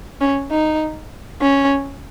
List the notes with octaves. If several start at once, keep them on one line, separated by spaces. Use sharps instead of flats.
C#4
D#4
C#4